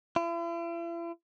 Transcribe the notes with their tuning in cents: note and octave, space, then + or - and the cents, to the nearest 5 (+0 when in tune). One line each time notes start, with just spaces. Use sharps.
E4 +45